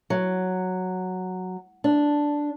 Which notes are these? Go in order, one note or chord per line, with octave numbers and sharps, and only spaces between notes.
F#3
D4